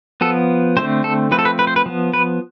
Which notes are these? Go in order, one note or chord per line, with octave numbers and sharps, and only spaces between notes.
F3 B3 A4
D3 A3 C4 C5
A4
F3 A3 C4 B4
A4
B4
B4
C5
B4
F3 B3
B4